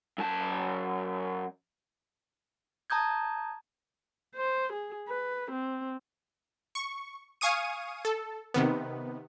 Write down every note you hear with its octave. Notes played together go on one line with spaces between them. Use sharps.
F#2 A5
A5 A#5 D#6 G6 G#6
C5
G#4
B4
C4
C#6
F5 G#5 C#6 D#6 D#7
A4
C3 D#3 B3